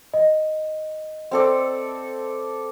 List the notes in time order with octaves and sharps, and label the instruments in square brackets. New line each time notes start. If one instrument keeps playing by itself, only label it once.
[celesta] D#5
[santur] C4 A4 D5